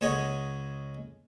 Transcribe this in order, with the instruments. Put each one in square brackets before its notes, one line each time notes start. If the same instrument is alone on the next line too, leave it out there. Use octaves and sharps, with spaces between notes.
[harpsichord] C#2 G#3 C#5 D#5 F#5 G#5